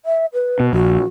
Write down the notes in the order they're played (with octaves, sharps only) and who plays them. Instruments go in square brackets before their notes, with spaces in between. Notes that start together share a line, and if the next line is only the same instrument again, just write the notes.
[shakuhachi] E5
B4
[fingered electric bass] B2
[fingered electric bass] A#1 [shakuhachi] F#4